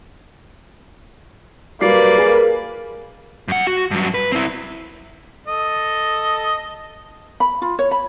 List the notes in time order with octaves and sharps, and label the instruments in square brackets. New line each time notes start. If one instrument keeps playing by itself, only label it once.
[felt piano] F#3 G3 C7 [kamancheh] A#3 B4 [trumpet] D5
[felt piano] G#4 A#4 G#5
[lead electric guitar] F#2 F#5
F#4
G2 F#3
B4
C4 E4
[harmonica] A4 D#5
[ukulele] B5
F4
C#5
B5